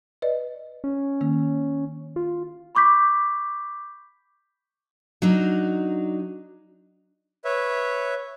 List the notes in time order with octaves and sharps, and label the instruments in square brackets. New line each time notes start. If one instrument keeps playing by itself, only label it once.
[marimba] B4 D5 D#5
[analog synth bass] C#4
[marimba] D#3 A#3
[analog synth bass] F4
[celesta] B5 C#6 D6 G6 B6
[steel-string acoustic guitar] F#3 D4 D#4
[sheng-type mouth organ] B4 C#5 E5